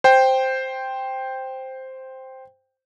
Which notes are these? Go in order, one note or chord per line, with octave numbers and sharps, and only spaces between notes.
C5 G5